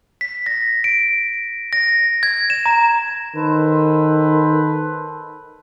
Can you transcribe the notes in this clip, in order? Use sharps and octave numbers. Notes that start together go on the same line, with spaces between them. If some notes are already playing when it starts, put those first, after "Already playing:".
B6
A#6
D7
A#6
G#6
E7
A#5
D#3 A4 B4 C5